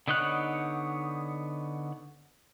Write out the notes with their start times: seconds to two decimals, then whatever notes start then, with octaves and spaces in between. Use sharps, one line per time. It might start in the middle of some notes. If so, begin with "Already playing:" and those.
0.08 D3 B3 D#4 C#5 F#6